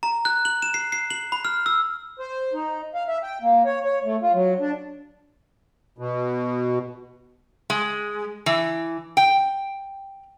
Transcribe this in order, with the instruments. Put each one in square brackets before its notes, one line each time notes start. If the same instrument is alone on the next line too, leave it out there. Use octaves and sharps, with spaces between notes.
[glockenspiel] A#5
F#6
F#7
E7
C7
C7
F#7
B5
F6
E6
[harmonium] C5
D#4
F5
E5
G5
A#3
C#5
C#5
A3
F4
F#3
D4
[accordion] B2
[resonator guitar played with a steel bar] G#3
E3
G5